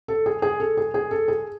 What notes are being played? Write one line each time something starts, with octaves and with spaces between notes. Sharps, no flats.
A4
G#4
G#4
A4
G#4
G#4
A4
G#4